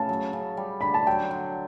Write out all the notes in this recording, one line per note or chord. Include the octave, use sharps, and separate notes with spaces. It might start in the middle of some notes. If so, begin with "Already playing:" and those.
Already playing: A2 C#3 A5
F#3
C#3
G3
D3 B5
A5
F#3 G5
D3